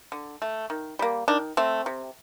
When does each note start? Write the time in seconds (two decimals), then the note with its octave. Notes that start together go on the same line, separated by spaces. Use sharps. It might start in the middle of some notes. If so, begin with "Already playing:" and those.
0.12 D3
0.42 A3
0.70 D#3
0.99 G3 A#3
1.28 D#3 D4
1.57 A3 C4
1.86 C3